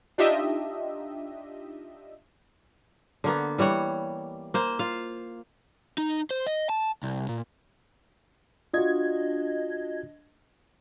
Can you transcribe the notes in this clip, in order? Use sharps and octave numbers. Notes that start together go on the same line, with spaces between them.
D4 D#4 F4 G4 D#5 E5
D3 A#3 B3
E3 G3 C#5 F#5
A#3 C5
F4 F5
D#4
C5
D#5
A5
C2
A#2
D4 F4 F#4 D#5 G#6